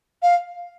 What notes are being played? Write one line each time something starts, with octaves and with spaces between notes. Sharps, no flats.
F5